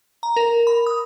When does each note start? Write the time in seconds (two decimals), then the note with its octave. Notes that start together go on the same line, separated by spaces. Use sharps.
0.23 A#5
0.36 A#4
0.67 B5
0.86 D#6